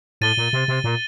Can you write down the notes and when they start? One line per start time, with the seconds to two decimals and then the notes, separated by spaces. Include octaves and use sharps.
0.21 A2 A6 D#7 G7
0.37 A#2
0.53 C3
0.68 C3
0.84 A#2